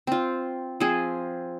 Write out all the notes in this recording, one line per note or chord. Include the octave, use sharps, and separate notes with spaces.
C4 F4
F3 C4 G#4